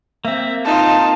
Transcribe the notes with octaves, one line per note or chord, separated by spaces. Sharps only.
A#3 C4 E5
D#4 F4 A5